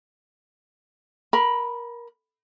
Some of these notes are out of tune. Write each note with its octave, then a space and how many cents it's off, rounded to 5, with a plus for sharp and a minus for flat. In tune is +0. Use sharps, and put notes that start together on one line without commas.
A#4 +20 B5 +0